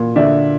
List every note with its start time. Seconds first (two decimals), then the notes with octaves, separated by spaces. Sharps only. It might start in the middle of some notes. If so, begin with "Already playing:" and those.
Already playing: A#2
0.16 D3 D5 E5